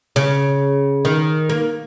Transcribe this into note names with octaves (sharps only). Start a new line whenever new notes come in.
C#3
D#3
A#3